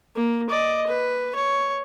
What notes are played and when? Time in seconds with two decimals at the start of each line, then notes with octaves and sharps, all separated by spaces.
0.16 A#3
0.50 D5 D#5
0.87 B4
1.35 C#5